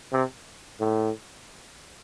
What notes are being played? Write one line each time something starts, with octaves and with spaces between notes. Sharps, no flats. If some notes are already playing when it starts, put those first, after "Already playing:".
C3
A2